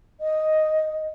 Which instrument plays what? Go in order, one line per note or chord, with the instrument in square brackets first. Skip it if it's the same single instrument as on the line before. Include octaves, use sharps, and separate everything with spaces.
[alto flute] D#5